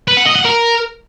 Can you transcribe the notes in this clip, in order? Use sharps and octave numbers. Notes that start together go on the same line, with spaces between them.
B4
F#5
D#5
F#5
A#4